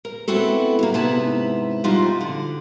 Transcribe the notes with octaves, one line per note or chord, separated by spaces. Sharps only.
A#4
B3 C4 E4 F#4 A4
A2 G3 A#3
G#2 C3 B3 E4 A5
F3 G3 D#4 F4 F#4
D3